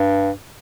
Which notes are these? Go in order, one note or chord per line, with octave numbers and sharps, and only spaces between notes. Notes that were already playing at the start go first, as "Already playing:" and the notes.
Already playing: G2